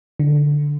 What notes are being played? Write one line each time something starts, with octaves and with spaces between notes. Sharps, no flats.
D3